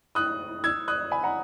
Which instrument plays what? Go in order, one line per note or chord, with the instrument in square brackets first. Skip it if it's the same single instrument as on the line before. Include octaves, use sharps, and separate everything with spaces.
[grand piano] D#6 F#6
E6 G#6
D#6 F#6
G#5 B5
F#5 A#5